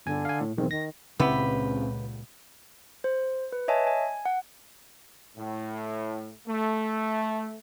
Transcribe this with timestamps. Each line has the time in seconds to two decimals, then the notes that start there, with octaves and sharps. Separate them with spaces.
0.06 G1 D3 G#5
0.25 F5 G#5
0.41 A2
0.57 B1 E2 D#3 C4
0.71 D#3 A#6
1.20 C#2 A#2 C#3 B3 C4 E4 G4 B4
3.04 C5
3.52 B4
3.68 C#5 D#5 E5 G#5 A5
3.87 G#5
4.25 F#5
5.37 A2
6.48 A3